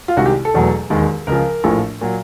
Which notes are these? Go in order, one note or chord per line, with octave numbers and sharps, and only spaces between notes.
F4
C2 C3 D#3 G#3 F#4
G4
A4
E1 E2 B2 F#3 A3
E1 D#2 D#3 G#3
C#2 C#3 F3 A#4
A#1 A2 F3 A3
A#2 F#3